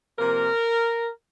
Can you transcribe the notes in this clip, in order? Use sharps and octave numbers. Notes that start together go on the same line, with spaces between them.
C3 F3 A#3 A#4